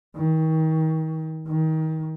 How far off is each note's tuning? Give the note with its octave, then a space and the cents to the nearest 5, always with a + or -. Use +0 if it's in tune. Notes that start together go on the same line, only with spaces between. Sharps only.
D#3 +35
D#3 +30